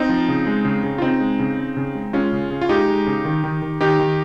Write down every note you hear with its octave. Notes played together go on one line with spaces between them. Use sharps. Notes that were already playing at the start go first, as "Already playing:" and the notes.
Already playing: C4 D#4
F3
C#3
G#3
C#3
C#3
F4
C#3 C4 D#4
G#3
C#3
C#3
C#3
G#3
G#3 C#4 F4
C#3
C#3
F4
G#3 D#4 G4
G#3
C#3
D#3
D#3
D#3
D#3 D#4 G4
D#3